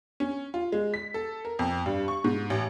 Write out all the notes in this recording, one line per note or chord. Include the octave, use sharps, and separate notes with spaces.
C#4
F4
G#3
B6
A4
A#4
F2
G2
C#6
G#2
A1